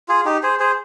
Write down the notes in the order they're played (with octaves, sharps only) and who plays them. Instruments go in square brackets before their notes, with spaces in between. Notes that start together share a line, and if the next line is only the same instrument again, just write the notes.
[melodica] F4 G#4
D#4 G4
G#4 C5
G#4 C5